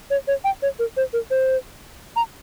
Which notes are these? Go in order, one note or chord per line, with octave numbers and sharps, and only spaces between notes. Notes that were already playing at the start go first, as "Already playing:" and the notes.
C#5
C#5
G5
C#5
A#4
C5
A#4
C5
A#5